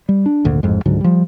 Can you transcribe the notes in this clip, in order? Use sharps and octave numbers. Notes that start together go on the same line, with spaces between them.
G3
D4
G#1 D2 A#2
A1 F2 G#2
C#2 G#2 D3 F#3
F3 G3